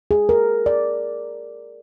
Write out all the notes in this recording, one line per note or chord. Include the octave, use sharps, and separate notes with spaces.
G#4
A#4
D5